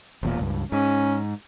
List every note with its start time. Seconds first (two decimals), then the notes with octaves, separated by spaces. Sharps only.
0.23 E1 E2 A#2
0.39 C#2 G2
0.72 G#2 C#4